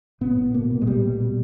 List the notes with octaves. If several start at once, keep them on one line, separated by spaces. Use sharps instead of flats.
A2 B3
A2
B2 A#3
B2
G#3
A#2 G3
A#2
B2